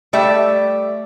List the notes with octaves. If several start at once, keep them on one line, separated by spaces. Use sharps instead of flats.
G3 A3 D5 E5